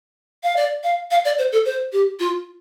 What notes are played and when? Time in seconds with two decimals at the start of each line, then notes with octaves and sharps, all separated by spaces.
0.43 F5
0.56 D5
0.83 F5
1.11 F5
1.25 D5
1.38 C5
1.52 A4
1.65 C5
1.92 G4
2.20 F4